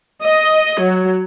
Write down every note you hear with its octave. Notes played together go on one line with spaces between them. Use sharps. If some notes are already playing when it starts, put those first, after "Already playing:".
D#5
F#3